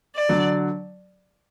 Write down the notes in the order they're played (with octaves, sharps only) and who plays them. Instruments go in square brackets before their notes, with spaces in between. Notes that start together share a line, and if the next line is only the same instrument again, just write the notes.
[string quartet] D5
[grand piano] D3 F#3